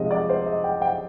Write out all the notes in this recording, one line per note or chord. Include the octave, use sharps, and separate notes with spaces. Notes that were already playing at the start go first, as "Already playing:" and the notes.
Already playing: C3 F3 G#3 D#4 D#5
D5
C5
D#5
G5
G5